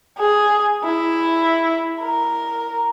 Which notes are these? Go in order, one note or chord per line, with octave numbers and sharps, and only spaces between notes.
G#4
E4
A#4